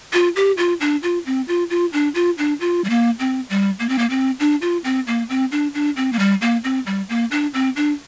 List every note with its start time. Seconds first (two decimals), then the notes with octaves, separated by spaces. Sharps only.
0.13 F4
0.36 G4
0.58 F4
0.81 D4
1.03 F4
1.26 C4
1.48 F4
1.70 F4
1.93 D4
2.15 F4
2.38 D4
2.60 F4
2.84 G3
2.90 A#3
3.20 C4
3.50 G3
3.80 A#3
3.89 C4
3.99 A#3
4.10 C4
4.40 D4
4.62 F4
4.84 C4
5.07 A#3
5.29 C4
5.52 D4
5.74 D4
5.97 C4
6.13 A#3
6.19 G3
6.42 A#3
6.64 C4
6.86 G3
7.09 A#3
7.31 D4
7.54 C4
7.76 D4